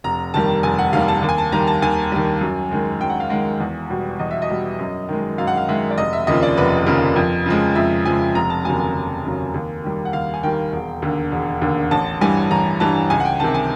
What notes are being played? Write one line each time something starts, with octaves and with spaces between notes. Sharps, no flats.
F1 A#5
D#2 D#3 G3 A5
F1 G#5
F#5
D#2 D#3 G3 F5
A5
D#2
G#5
A5
D#3 G3 A#5
A5
D#2 G#5
D#3 G3
F#2
D#3 G#3
F#2 G5
F#5
F5
D#3 G#3 F#5
E2
B2 G3
E2 D#5
E5
D#5
B2 G3
F#2
D#3 G#3
F#2 F5
F#5
F5
D#3 G#3 E5
D5
F1 D#5
E5
D#2 C#3 F3 D#5
D5
F1 B4
D#2 C#3 F3 A#4
F2
C#3 F3 G#3
F2 E5
C#3 F3 G#3 G#5
F1 A#5
A5
D#2 C#3 F#3 G#5
G#5
F1
D#2 C#3 F#3
D#2
D#3 G3
F#5
D#2 F5
G#5
D#3 G3 G5
E1
D#2 D3
E1
D#2 D3
A1 A5
G2 E3 G3 G#5
A1 A#5
G2 E3 G3 A5
C#2 G#5
F#5
G5
C3 D#3 A5
G#5